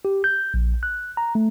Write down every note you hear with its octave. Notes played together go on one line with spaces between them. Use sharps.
G4
G6
A#1
F#6
A#5
A3